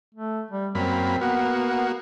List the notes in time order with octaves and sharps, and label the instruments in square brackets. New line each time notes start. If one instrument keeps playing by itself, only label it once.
[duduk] A3
G3
[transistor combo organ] F#2 A#3 B5 [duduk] C4
[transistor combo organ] A#3 F#4 [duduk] B3